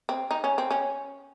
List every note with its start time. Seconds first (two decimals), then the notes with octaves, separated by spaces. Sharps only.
0.09 C4
0.31 D#4
0.44 C#4
0.58 C4
0.71 C#4